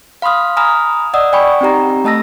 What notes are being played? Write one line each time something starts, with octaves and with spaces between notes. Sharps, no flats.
F5 B5 C6 D#6 F6
G#5 A#5 B5 D#6 F6
D5 D#5 F#5 D#6 E6
D5 G5 G#5 B5 C#6
C4 D#4 G4 A#5
A3 D#5 A5 E6 A#6